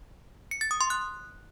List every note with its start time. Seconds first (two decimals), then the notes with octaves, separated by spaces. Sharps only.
0.51 C#7
0.61 A6
0.71 D#6
0.81 C6
0.90 F#6